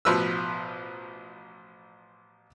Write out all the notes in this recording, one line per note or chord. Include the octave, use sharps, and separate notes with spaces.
A1 B2 F3 B4 E6